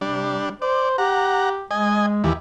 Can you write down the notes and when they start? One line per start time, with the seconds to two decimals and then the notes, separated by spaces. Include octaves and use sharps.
0.01 C3 G3 D4
0.62 C5 D5
0.98 G4 F#5 A#5
1.71 G#3 D#5 G#5
2.24 D#2 E3 G4